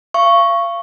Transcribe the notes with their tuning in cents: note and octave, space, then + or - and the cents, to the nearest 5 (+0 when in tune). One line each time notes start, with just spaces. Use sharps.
F5 -35 C#6 +0